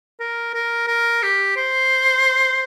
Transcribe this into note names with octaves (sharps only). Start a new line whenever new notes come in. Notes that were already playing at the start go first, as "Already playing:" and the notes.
A#4
A#4
A#4
G4
C5